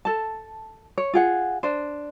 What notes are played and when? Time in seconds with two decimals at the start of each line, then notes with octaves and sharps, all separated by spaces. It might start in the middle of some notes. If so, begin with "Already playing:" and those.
0.05 A4 A5
0.98 C#5
1.14 F4 G#4 F#5
1.63 D4 C5